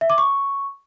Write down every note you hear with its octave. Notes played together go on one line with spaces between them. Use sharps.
E5
D6
C#6